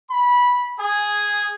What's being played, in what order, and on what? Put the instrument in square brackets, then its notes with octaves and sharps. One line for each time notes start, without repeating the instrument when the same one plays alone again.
[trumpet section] B5
G#4